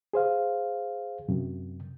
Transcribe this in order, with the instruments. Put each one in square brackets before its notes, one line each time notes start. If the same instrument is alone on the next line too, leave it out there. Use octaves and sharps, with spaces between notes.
[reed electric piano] G#4 C5 F5
F#2 C3